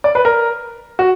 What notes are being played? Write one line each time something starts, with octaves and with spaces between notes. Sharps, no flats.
D5
B4
A#4
F#4